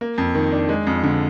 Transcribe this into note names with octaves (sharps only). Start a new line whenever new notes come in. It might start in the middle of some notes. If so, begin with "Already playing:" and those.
A#3
F2
D#3
D4
G#3
F2
D3